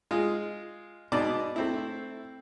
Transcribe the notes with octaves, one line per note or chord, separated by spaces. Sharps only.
G#3 F4
G#2 B2 D5 D#5 A5 D6
A3 C4 E4